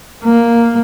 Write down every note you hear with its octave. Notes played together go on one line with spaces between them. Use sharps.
A#3